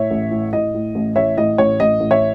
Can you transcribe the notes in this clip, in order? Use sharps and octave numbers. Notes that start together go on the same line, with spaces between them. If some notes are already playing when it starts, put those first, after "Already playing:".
Already playing: A2 C#5 E5
A1
A2
A2 D#5
A2
A1
A1 C#5 E5
A2 D#5
A1 C#5
A1 D#5
A1
C#5 E5